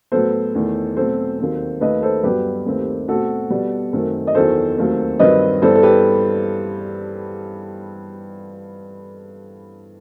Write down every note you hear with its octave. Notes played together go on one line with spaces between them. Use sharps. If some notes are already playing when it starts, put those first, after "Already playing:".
A2 F#3 B3 A4 C5
E2 D#3 A3
B2 F#3 A3 C4 A4 C5
D#2 D#3 F#3 C4
D#2 D#3 A3 B4 D#5
A4 C5
G2 F#3 B3 G4 B4
D#2 D#3 A3 C4
B2 A3 C4 F#4 A4
B2 G3 B3
F#2 D#3 A3 C4
D#5
E2 D#3 F#3 A4 C5
D#2 D#3 F#3 A3 C4
G2 D#3 F#3 C4 B4 D#5
G2 E3 G3 B3 A4 C5
A4
G4 B4